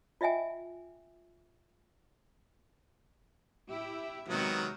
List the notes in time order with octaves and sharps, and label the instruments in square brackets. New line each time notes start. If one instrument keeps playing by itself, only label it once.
[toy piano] F4 D#5 E5 G5 G#5
[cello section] E4 G4 E5
[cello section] C3 G#3 [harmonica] D#3 F#3 B3